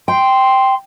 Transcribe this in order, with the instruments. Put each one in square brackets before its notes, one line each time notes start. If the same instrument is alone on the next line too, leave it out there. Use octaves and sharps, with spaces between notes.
[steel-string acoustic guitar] G5 [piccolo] C6